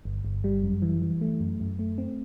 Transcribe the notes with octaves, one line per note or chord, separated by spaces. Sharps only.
G1
G1
G3
F#2
E3
E3
A3
F#2
F#2
A3
C4